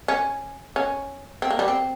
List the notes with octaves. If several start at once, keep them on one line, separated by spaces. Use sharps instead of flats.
C#4
C#4
C4
A#3
G3
C4